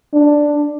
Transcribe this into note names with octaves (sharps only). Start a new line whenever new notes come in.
D4